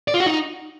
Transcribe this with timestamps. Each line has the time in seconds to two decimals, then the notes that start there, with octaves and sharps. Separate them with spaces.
0.08 D5
0.14 F4
0.20 F#4
0.26 D#4